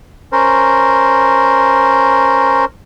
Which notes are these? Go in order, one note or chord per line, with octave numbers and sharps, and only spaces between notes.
C#4 A#4 C5